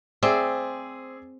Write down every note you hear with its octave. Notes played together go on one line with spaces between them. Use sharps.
C4 G#4 D5 E5